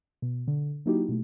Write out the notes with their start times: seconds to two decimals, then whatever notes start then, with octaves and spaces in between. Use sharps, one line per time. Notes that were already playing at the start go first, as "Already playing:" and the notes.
0.22 B2
0.48 D3
0.86 F#3 A#3 D#4 E4 F#4 G4
1.09 B2 A3